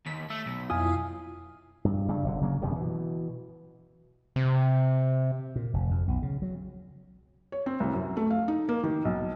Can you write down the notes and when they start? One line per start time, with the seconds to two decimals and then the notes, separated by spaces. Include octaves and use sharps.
0.06 D#2 B6
0.30 A3 E6
0.46 B1
0.70 F2 E4 F4 G#5 D#6
1.85 G2
2.09 G2 C#3 G3
2.24 F#1 B2 D3
2.41 C#3 F#3 A#3
2.62 E1 F#2 C3 D#3
2.76 B2 E3
4.36 C3
5.56 A#2
5.74 F1
5.91 F2
6.08 B1
6.22 C#3
6.42 F#3
7.52 C#5
7.66 C4
7.80 C2
7.93 F#2
8.17 A3
8.31 F5
8.48 D#4
8.69 A#3
8.83 D#3
9.05 B1